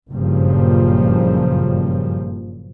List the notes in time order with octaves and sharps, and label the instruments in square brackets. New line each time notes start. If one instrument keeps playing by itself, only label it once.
[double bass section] F#1 G2 A#2 C#3 F3